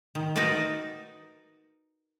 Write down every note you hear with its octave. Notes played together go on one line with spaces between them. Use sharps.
D#3
D#4 F#4 A#4 B4 D5